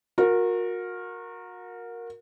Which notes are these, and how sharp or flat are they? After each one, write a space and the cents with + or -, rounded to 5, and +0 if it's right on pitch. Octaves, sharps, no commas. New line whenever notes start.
F#4 -35 A#4 +0